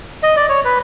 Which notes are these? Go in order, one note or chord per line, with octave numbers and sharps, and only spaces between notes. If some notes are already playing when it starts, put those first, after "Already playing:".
D#5
D5
C#5
B4